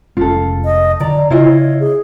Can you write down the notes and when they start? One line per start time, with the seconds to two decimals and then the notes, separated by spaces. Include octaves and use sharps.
0.17 F1 G#3 C#4 F4 A4
0.65 D#5
1.00 D3 D5 A#5
1.30 C#3 E4 F4 C#5 D#5
1.80 G#4